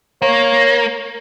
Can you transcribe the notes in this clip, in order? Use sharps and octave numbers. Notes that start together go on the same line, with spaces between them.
A#3 C#5